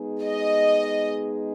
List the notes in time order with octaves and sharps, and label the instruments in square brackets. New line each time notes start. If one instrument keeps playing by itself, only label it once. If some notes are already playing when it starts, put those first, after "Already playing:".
Already playing: [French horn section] G#3 B3 D#4 G#4
[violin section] D#5